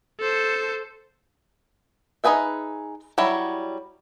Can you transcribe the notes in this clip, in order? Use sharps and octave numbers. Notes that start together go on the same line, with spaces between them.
A4 C5
D#4 F4 G#4 B4 E5
F#3 G3 E4 C#5